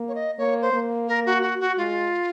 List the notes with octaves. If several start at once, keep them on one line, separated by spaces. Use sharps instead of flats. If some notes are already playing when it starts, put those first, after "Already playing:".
Already playing: A#3
C#5
D#5
A#3 C#5
C5
A#3
A#4
F#4
F#4
F#4
G#3 F4